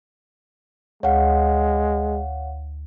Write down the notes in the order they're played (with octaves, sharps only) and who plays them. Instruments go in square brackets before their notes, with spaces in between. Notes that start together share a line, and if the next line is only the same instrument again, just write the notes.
[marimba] D2 [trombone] G#3 [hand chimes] C#5 F5 F#5